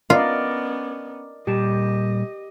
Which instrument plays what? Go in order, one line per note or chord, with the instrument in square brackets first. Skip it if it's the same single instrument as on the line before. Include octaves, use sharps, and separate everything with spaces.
[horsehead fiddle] B3 C#4 [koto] F4 [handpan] A#4 D5 D#5
[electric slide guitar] A#2 G3 A5 [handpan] G4 [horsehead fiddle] D#5